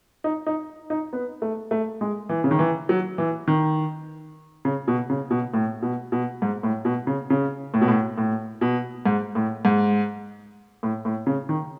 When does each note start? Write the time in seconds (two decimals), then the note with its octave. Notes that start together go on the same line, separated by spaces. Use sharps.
0.24 D#4
0.46 D#4
0.90 D#4
1.13 B3
1.42 A3
1.71 A3
2.01 G#3
2.29 E3
2.44 C#3
2.51 D#3
2.59 E3
2.89 F#3
3.18 E3
3.48 D#3
4.65 C#3
4.88 B2
5.10 C#3
5.31 B2
5.54 A2
5.82 B2
6.12 B2
6.42 G#2
6.63 A2
6.85 B2
7.07 C#3
7.30 C#3
7.74 A2
7.81 B2
7.88 A2
8.18 A2
8.61 B2
9.06 G#2
9.35 A2
9.65 G#2
10.83 A2
11.05 A2
11.27 C#3
11.49 D#3